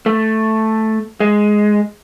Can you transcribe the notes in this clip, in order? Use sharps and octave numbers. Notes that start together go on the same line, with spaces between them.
A3
G#3